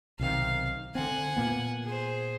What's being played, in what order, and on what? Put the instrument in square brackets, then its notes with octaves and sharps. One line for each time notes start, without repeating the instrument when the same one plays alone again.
[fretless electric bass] B1 C3 D#3 [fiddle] F5
[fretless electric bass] D3 C4 [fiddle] F#5 G#5
[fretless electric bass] A#2 A#3 B3
[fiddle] G#4 C5